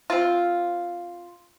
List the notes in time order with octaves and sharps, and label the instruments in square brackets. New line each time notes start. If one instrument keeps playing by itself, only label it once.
[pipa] C4 F4